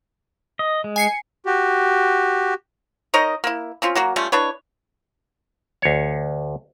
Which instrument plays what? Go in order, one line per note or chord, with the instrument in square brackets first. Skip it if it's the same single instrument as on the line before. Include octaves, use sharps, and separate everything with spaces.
[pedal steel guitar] D#5
G#3
[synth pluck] G#5 C7 C#7
[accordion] F#4 G4
[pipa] D#4 A#4 C#5 D#5
A#3 E4
C4 C#4 F4
F#3 A#3 F#4
G3 A3 C#4 F4
D4 E4 B4 C#5
[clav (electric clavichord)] D2 C#5